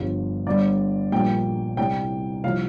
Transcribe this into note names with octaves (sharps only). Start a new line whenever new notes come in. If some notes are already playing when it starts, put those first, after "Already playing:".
Already playing: G1 G2 F3
G1 G2 G3 D5
A#1 A#2 G3 G5
C2 C3 G3 G5
C2 C3 F3 F5